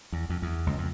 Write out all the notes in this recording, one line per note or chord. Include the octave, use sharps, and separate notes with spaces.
E2
F2
E2
C#2
F2